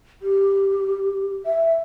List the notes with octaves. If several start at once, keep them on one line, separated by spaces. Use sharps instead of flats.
G4
E5